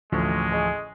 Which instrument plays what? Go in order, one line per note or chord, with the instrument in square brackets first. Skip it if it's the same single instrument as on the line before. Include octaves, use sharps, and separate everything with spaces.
[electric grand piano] A1 A3 C#6 [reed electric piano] D2 F3 [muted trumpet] G#3
[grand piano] G#4 D#5